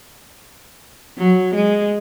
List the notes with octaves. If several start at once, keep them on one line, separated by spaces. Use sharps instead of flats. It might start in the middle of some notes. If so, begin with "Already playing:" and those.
F#3
G#3